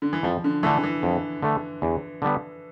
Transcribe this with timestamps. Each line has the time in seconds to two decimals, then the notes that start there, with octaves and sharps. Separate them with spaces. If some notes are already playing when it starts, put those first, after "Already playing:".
0.02 D3
0.13 E3
0.23 F2 F3
0.44 D3
0.63 D3 E3 A3
0.83 E3
1.03 F2
1.43 D3 A3
1.82 E2
2.22 D3 G3 B3